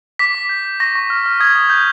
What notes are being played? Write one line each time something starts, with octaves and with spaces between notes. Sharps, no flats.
D6 B6
D6
G6
G6
C#6 A#6
C#6
F6
F6
D#6 G#6
D#6
G6